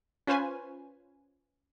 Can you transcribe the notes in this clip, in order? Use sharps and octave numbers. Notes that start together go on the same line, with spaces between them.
C#4 F4 B4 C5 G#5